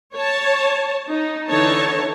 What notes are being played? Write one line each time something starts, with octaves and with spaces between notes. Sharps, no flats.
C#5 A5
D#4
D3 E3 D#4 C#5 A5